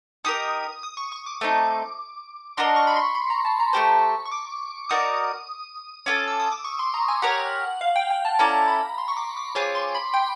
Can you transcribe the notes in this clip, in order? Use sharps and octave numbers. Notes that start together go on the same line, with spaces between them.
D#4 G4 A#4 D#6
D#6
C#6
C#6
D6
A3 C4 D#4
D4 F#4 A#4 D#5 C6
C#6
B5
C6
B5
A#5
A5
A#5
A3 D4 G4 C5 C#6
C#6
D6
D#4 F#4 A#4 D5 D#6
C#4 F4 A4 D6
E6
D#6
D6
C#6
C6
A#5
G#5
G4 A#4 C#5 F#5
F5
G5
G5
A5
C#4 E4 A4 D5 A#5
B5
C6
C#6
D6
D6
C4 F4 G#4 C#5 D6
C6
B5
G5